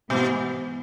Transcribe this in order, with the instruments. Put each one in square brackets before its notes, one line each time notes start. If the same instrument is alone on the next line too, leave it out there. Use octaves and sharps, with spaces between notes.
[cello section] G#2 E3 B3 [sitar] B2